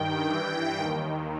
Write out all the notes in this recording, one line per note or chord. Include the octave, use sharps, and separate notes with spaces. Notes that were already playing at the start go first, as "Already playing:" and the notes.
Already playing: G2 D#3 G5
G2 E3
D#2 D#3